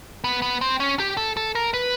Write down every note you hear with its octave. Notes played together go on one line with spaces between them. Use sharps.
B3
B3
C4
C#4
G4
A4
A4
A#4
B4